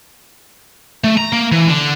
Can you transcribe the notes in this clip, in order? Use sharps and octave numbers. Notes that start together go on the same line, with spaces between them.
A3
A#5
A#3
E3
D3